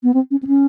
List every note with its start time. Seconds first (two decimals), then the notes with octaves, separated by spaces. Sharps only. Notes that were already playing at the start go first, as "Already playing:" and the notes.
0.03 B3
0.14 C4
0.31 C#4
0.43 C4
0.47 C#4